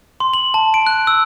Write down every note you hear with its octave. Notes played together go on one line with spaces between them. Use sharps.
C6
F#7
A5
D7
F#6
E6